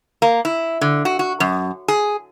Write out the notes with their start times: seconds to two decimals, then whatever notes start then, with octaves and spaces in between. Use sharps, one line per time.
0.22 A#3
0.45 E4
0.81 D3
1.05 F#4
1.19 F#4
1.40 F#2
1.88 G#4